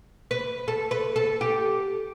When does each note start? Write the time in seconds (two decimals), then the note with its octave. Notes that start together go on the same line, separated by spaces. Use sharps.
0.31 B4
0.68 A4
0.91 B4
1.16 A4
1.41 G4